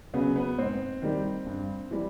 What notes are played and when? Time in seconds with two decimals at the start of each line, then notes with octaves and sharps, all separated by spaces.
0.14 C#3 F#3 B3
0.36 B3
0.58 G#2 C4
1.02 D#3 G3
1.46 G2
1.91 E3 G3